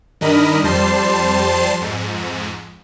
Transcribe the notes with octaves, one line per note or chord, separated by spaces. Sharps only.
G2 D#3 D4 A#4 D#5 B5
F2 G3 C5 A5 C6 C7
F2 G#2